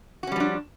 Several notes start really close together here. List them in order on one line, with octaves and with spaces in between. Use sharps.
F#4 C#4 G3 F3 D4